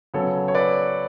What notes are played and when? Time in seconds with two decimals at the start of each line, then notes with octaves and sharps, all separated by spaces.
0.14 C#3 F#3 B3 A4 C#5
0.48 C#5
0.55 B4 D5